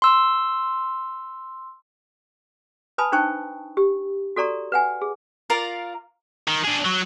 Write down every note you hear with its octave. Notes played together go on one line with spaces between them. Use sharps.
C6 E6
B4 G#5 A5 B5 D#6
D4 D#4 C5 G5 A5 C#6
G4
F#4 A4 D5 A#5 C#6
B4 F#5 G#5
G#4
F4 A#4 D5 F5
D#3
D4 G#4
F#3